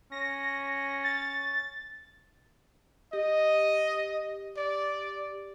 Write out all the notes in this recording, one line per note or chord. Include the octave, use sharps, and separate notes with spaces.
C#4 A#6
A6
G4 D#5
D5